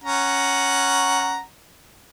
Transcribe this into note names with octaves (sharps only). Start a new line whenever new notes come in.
C#4 F#5 A#5